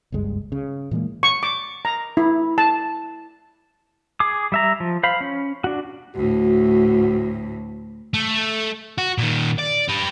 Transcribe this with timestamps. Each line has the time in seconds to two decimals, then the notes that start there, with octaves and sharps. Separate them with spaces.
0.12 F#1 C#2 G2 G#3
0.52 C#3
0.91 A#2 E3 G#3 A#3
1.23 C#6
1.43 D6
1.85 A#5
2.17 E4
2.58 A5
4.20 G#4 D6
4.52 G3 E5 A#5
4.80 F3
5.03 C5 F5 B5
5.21 C#4
5.64 D4 F#4
6.16 D2 A2 F#4
8.14 A3
8.98 F#4
9.18 A#2 D#3
9.59 D5
9.89 G4 B4